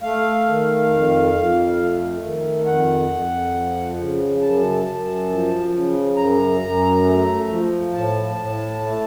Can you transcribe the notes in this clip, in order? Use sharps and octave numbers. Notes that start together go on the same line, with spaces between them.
A3 F5
D#3
F2
F2
A3
D#3
F2 F#5
F2
F3
C#3
F#2 A5
F#2
F3
C#3
F#2 A#5
F#2
A3
F3
A2 A5
A2
A3